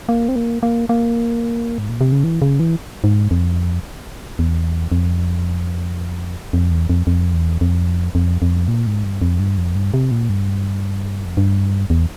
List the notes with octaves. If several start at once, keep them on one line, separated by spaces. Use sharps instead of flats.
A#3
C4
A#3
A#3
A#3
G#2
A#2
C3
C#3
E3
C#3
E3
G#2
F2
E2
F2
F2
E2
F2
F2
E2
F2
F2
F2
A#2
G#2
G2
F2
G2
F2
G2
C3
A#2
G2
F2
G2
E2